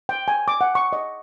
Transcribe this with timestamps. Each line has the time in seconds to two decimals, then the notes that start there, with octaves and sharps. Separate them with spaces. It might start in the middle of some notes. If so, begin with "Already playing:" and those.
0.09 G5
0.28 G#5
0.48 D6
0.61 F#5
0.75 C#6
0.93 D#5